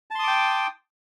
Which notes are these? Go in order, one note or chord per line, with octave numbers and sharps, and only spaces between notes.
G5 A5 C6 D6 D#6